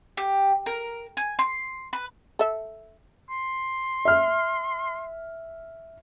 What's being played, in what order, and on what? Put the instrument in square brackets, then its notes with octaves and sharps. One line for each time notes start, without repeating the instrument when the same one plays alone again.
[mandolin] G4
A#4
G#5
C6
B4
[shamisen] A4 E5
[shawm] C6
[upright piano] E5 F6